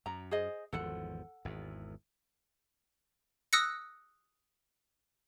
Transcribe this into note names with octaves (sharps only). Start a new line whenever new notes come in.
F#2 A#5
G#4 C5 D#5
G#1 E2 F3 A4 F#5
G#1 E2
D#6 E6 F#6 A#6 C#7